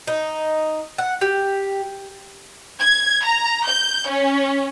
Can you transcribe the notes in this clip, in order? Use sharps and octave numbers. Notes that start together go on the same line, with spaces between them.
D#4
F#5
G4
G#6
A#5
G6
C#4